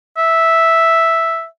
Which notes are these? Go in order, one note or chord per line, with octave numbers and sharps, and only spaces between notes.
E5